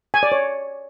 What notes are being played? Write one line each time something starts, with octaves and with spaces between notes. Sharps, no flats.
G#5
D5
C#5